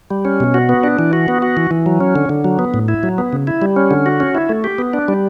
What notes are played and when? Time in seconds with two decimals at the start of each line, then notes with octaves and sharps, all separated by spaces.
0.10 G3
0.25 C#4
0.40 B2
0.54 F#4
0.69 B3
0.83 D4
0.99 E3
1.13 F#4
1.28 B3
1.42 F#4
1.57 E3
1.71 E3
1.86 F#3
2.00 C#4
2.16 D3
2.29 D3
2.45 F#3
2.59 B3
2.74 A2
2.88 E4
3.03 F#3
3.18 B3
3.33 C#3
3.47 E4
3.62 G3
3.76 C#4
3.91 D3
4.06 F#4
4.20 C#4
4.35 E4
4.49 A3
4.64 G4
4.78 B3
4.93 D4
5.08 G3